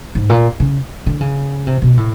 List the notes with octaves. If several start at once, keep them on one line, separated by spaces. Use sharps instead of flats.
G#2
A#2
C#3
D3
C#3
C3
B2
A2